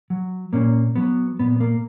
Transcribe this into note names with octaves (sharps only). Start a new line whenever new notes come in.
F#3
A#2 A#3 C#4
F#3 B3
A#2 B3
A#3